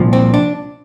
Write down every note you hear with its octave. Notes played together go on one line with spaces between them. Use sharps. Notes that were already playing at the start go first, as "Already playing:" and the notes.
Already playing: C2 A#2 F3
C4
D4